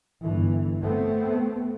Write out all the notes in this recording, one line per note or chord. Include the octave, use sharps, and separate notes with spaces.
G1 G2 E3
A3 B3 C4